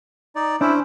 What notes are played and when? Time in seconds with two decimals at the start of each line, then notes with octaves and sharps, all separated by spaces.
0.36 D#4 D5
0.61 C#4 D4 E4 C5